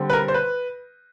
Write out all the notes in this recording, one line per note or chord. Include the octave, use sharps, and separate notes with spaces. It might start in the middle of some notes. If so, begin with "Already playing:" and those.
Already playing: D3 G3 C4
B4
A#4
C5
B4